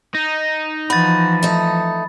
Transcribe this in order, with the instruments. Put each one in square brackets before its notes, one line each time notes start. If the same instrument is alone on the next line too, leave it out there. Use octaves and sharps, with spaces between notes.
[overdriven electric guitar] D#4
[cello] E3 F3 [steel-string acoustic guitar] F#4 [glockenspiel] B5 A6
[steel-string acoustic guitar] A3 D#4